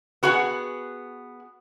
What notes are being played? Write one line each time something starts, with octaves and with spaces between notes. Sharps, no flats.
B3 F#4 G#4 F#5